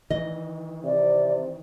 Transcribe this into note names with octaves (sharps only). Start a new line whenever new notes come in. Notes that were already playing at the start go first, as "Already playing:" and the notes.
D#3 E3 D#5
C3 D5